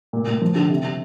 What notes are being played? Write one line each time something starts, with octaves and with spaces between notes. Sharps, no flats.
A#2
A#2
F3
D3
C3
C3